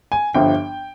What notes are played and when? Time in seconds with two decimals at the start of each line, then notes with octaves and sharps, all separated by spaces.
0.12 G#5
0.34 G1 G2 F3 G5